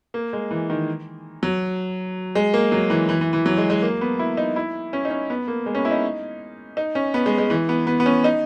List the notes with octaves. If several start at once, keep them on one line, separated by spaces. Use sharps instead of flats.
A#3
G#3
E3
D#3
F#3
G#3
A#3
F#3
E3
E3
E3
E3
F#3
G#3
G#3
A#3
B3
E4
D#4
E4
C#4
D#4
C#4
B3
A#3
G#3
C#4
B3
E4
D#4
D#4
C#4
B3
G#3
G#3
E3
B3
B3
B3
C#4
D#4